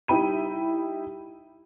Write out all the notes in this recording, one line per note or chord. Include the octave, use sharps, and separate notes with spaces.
G3 D#4 E4 G5 B5 D#7